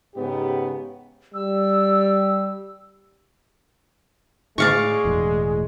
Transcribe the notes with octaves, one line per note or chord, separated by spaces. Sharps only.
G#2 C#3 B3 G4
G3 E6
A2 G#3 D5 F5 C#6
E1 A2